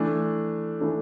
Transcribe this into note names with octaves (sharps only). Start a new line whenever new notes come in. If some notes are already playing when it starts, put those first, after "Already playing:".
Already playing: E3 A3 D4
E3 A3 D4